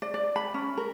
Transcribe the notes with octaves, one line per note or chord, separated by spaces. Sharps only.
D5
D5
B5
C#4
A#4